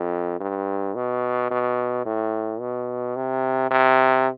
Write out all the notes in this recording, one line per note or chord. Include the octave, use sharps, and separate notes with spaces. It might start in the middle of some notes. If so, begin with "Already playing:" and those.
Already playing: F2
G2
B2
B2
A2
B2
C3
C3